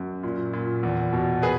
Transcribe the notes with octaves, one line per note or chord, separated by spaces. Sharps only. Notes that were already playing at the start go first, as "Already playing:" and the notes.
Already playing: F#2
A#2
A#2
E2
B2
G#4 B4